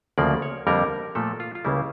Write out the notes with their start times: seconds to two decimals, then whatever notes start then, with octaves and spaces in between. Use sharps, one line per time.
0.18 D2 C#3 F3 A#3 D5
0.42 C#5
0.67 F2 D3 G3 A#3 A#4
1.15 A#2 F3 A3 A4
1.40 F4
1.55 F4
1.64 C#2 C#3 G3 A#3 E4